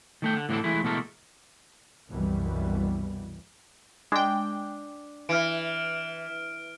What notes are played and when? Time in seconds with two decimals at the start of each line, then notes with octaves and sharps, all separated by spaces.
0.22 D#3 A3 G5
0.35 D3
0.49 A2 D3 E3 C4 D4 A4
0.64 E3 G#3 A3 E4
0.84 B2 E3 G#3 A3 A4 A#4
2.08 C2 F#2 B2 E3 G3
4.12 G#3 D4 G5
5.29 E3 F6 D7